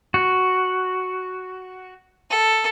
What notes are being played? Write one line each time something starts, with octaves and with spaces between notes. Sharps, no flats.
F#4
A4